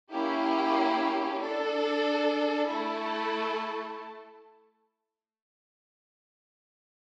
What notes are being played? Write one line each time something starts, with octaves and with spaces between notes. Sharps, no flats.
A#3 C#4 E4 G4
D4 A4
A3 E4 A4 A5